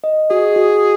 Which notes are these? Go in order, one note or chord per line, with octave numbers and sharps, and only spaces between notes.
D#5
F#4 G#4
F#4